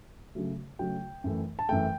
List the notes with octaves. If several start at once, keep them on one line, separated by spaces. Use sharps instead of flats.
C#3 F#3 A3
C#3 F#3 A3 G5
F#2 E3 A3
A5
F#2 E3 A3 G5